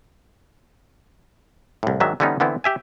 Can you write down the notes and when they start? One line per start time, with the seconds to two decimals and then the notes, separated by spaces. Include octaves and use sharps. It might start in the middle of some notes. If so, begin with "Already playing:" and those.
1.83 C2 A2
2.00 G#2 D#3 F#3 D4 E5
2.20 D3 E3 G3 B3 C#4 D#4
2.40 D3 E3 B3 C4 E4
2.64 G4 E5 G#5